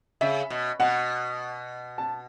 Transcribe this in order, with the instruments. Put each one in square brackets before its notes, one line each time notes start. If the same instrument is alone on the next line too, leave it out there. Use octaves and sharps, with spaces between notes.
[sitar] C#3 [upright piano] E5
[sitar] B2
[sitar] B2 [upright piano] F#5
[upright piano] A5